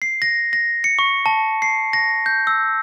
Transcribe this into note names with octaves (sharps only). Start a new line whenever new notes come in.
C7
A#6
A#6
C#7
C#6
A5
C7
A#6
G6
E6